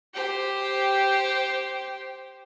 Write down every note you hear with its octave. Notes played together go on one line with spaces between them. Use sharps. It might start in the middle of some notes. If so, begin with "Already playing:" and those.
G4 C5